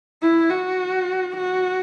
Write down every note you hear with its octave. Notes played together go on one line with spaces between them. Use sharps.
E4
F#4
F#4